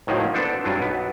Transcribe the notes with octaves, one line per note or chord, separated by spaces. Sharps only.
A2 D#3 F3 F#3 A#3
B3 D4 A4 C5
G2 F#3 D4 F4
B1 B3